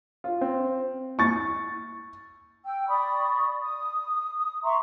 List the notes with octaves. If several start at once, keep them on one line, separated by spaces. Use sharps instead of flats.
F4
C4
C#6 A6
G5 E6
D5 B5 C#6 D#6
D#6
E5 A#5 C6 C#6